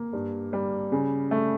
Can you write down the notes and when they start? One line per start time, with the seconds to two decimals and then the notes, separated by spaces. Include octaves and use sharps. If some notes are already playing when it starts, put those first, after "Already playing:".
Already playing: A#3
0.13 G2
0.53 G3
0.92 C#3
1.31 A3